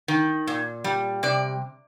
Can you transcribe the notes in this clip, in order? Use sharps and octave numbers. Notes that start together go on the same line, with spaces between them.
D#3
A#2
G3
C3 D5